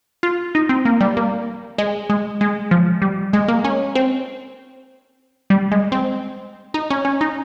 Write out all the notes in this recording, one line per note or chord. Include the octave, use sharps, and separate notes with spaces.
F4
D#4
C4
A#3
G3
A#3
G#3
G#3
G#3
F3
G3
G#3
A#3
C#4
C4
G3
G#3
C4
D#4
C#4
C#4
D#4